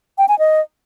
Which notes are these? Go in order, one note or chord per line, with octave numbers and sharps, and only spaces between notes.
G5
G#5
D#5